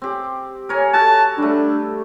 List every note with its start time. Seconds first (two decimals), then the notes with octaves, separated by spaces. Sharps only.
0.02 C4 G4
0.69 A#4 C#5 G#5
0.93 F#4 A4 A5
1.38 G3 A3 D4